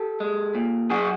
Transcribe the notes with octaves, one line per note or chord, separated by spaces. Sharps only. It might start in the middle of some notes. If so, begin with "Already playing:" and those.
Already playing: G4 A4
G#3
A#2
F#2 F#4 G#4